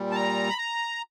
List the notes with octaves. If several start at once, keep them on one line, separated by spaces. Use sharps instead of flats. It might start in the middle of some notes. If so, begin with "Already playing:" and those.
Already playing: A#2 G3
A5
A#5
B5
A#5